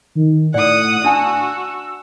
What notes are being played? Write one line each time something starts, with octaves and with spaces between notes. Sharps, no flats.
D#3
A2 D5 F#5 D#6
D4 F#4 A5 E6